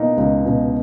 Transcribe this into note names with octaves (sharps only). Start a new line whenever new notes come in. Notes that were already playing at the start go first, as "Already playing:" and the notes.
Already playing: B2 A#3 D#4
C#2
B2